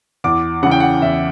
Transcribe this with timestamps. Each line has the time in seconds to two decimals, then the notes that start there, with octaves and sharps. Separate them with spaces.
0.24 E2 D6
0.63 C#3 E3 F#5
0.71 G5
0.80 F#5
1.02 E2 E5